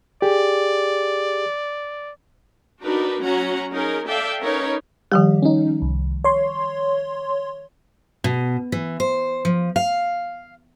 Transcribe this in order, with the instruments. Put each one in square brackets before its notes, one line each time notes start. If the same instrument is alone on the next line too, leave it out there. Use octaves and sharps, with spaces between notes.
[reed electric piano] G4 G#4 [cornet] D5
[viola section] D4 D#4 F#4 A#4 B4
F#3 C#4 F#4 F#5 A#5
C#4 D#4 G#4 A#4
A4 D5 E5 F5 G5
C#4 D#4 A#4 B4 C#5
[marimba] D#3 F3 G3 [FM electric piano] G4
[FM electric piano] C#4 D#4
C2
C#5 C6
[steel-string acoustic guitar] B2
E3
C5
F3
F5